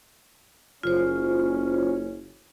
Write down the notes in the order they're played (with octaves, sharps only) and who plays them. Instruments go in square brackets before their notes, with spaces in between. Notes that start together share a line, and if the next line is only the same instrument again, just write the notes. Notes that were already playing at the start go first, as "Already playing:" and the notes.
[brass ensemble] F#1 C#4 [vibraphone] F4 C5